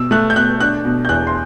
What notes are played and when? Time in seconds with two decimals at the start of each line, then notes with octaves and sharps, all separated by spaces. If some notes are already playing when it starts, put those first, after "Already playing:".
Already playing: B2 E6
0.11 A3 F#6
0.30 G6
0.36 B2 F#6
0.60 D4 F#6
0.85 B2
1.05 G6
1.09 E2 F#6
1.27 C6